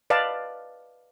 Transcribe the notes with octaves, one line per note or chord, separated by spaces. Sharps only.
B4 D5 D#5 F5 A5